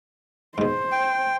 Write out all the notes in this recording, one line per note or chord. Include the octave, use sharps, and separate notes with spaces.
G#2 B2 C5
G5